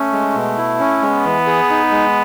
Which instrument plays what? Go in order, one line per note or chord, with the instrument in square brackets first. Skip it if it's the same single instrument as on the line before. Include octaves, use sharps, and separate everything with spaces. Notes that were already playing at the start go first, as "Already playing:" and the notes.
Already playing: [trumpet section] A3 [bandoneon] C#4
[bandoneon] G#3
B2
E4
C#4
[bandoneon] G#3 [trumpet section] B3
[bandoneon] E3
G#4
D#4
G#3